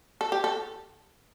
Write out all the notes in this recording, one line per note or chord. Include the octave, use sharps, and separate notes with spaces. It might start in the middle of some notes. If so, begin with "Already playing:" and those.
A4
G4
A4